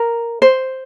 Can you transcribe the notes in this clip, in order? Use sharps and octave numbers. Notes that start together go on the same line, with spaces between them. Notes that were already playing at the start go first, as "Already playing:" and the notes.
Already playing: A#4
C5